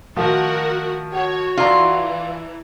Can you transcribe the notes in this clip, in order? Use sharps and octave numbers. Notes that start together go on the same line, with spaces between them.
D#3 F3 A3 F#4 A#4 F#5
F#4 C#5
E3 F4 A4 D5 A#5